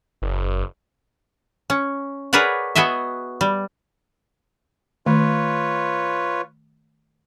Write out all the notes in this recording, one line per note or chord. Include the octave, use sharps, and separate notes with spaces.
F#1
C#4
G#4 A#4 B4 C#5 D5 F#5
B3 F#4 G#4 D#5 E5
G3
D#3 A3 F4 B4 C#5 B5